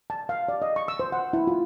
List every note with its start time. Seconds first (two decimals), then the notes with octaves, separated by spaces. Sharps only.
0.10 A5
0.29 F5
0.48 D5
0.62 D#5
0.76 C#6
0.88 E6
1.00 C5
1.12 F#5
1.33 E4
1.47 F4